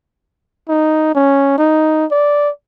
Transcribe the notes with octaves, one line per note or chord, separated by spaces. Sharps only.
D#4
C#4
D#4
D5